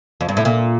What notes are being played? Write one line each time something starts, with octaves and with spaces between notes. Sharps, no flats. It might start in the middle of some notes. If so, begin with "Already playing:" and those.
F2
G2
A2
A#2